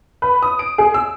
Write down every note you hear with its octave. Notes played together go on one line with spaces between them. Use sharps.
B4
D#6
D7
G#4
E6